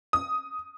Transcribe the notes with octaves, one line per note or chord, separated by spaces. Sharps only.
D#6